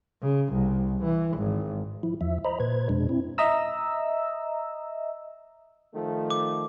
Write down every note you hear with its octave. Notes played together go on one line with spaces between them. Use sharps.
C#3
C2
E3
G#1
F3 E4
E2 F3 E5
C5 D#5 A#5 B5
A#2 B4 C5 G#6
F2 B2 G#3 D4
C4 E4
D#5 E5 A#5 E6
D#3 F3 A3
D6